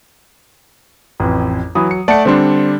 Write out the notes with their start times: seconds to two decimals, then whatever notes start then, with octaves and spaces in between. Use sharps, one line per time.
1.20 A1 F2
1.75 E3 F#3 B5 D#6
1.91 C#7
2.08 A3 D5 F#5 A5 C#7
2.25 D3 G3 C4 D4 C6